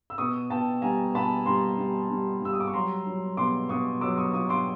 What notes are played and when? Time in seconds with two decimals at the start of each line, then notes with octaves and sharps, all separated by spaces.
0.10 E6
0.18 B2 C#6 D#6
0.50 B2 G5 A5
0.82 G3 G#5 A#5
1.14 B2 A5 B5
1.46 G3 A#5 C6
1.78 G3
2.10 G3
2.42 G3 E6
2.53 D#6
2.60 D6
2.67 C#6
2.74 F#3 A#5 C6
3.06 F#3
3.37 B2 C6 D6
3.69 B2 C#6 D#6
4.01 F#3 D6 E6
4.18 C#6 D#6
4.33 F#3 C#6 D#6
4.49 C6 D6